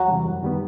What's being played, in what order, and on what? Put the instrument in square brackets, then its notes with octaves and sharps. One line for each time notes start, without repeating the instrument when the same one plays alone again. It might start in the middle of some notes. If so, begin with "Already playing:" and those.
Already playing: [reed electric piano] E2 [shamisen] F#3
[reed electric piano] C3 E3 G3
F#2
D#3 G3 B3